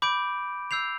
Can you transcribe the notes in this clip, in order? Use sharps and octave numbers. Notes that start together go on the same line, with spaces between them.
B5 D6 G6 D7
E6 G6 C7 F7